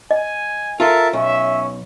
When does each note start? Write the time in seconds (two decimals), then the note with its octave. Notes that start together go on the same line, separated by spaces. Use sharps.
0.11 D#5 G#5
0.80 F4 A4 A#4 E5 A5
1.13 B1 C#4 E5